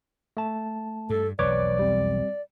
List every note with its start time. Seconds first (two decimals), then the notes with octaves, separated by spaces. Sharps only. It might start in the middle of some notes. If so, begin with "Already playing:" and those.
0.37 A3 A5
1.10 G2 A4
1.39 E1 B1 F2 B4 C#5 D5 D6
1.79 G3 C4